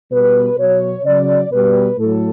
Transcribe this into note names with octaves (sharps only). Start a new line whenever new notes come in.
B2 G3 B4
B2 F#3 C#5
C#3 F#3 D5
B2 G3 B4
A2 F#3 A4